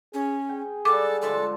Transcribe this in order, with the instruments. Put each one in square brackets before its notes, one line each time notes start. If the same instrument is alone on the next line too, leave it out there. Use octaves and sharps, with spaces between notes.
[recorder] C#4 [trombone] G#4
[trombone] G#4 [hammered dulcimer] G5
[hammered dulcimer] G3 D4 F#4 [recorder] A4 [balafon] D6
[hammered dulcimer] D3 F3 G#3 [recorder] A4